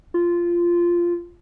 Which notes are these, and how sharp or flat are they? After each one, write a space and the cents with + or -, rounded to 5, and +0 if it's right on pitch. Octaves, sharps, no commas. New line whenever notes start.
F4 -10